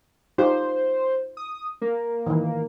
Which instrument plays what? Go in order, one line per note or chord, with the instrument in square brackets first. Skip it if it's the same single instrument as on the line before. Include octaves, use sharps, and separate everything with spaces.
[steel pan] D#4 F4 G4 [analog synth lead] C5
[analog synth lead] D#6
A#3
[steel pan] D#3 E3